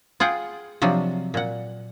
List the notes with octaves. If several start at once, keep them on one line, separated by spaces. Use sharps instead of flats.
F4 G#4 F#5 G5
C3 F3 F#3 D4
A#2 F#5